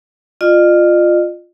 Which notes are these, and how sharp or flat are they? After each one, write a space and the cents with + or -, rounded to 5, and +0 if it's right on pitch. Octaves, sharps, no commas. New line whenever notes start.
F4 +0 D#5 -45